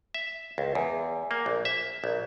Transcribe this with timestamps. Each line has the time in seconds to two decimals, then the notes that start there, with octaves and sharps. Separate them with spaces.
0.14 E5
0.58 C#2
0.75 E2
1.31 A#3
1.46 A#1
1.65 E5
2.04 A#1